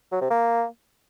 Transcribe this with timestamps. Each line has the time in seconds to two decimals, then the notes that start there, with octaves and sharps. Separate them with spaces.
0.12 F#3
0.21 C3
0.30 A#3